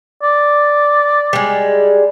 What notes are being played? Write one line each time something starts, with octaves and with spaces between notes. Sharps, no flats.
D5
G3 G#3